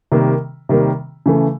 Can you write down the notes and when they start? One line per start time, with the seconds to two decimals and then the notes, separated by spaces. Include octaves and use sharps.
0.12 C3 D#3 G3 A#3
0.69 C3 D#3 G3 A#3
1.26 C#3 E3 A3